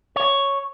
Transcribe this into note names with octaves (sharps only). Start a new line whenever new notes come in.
C#5